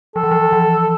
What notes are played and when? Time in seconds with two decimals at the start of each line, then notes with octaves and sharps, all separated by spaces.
0.16 F3 A4
0.23 E3
0.31 F3
0.53 E3